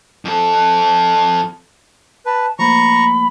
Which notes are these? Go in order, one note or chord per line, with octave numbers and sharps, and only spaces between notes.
F2 A4
B4 A5
F3 A3 A#3 A#5 B5 C#6